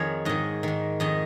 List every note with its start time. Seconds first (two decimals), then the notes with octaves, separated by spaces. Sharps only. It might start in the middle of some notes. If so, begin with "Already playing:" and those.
Already playing: F2 D#3 G#4 A#4 C#5
0.25 G#2 D#3 D#5
0.63 G#2 D#3
1.00 F2 D#3 D#5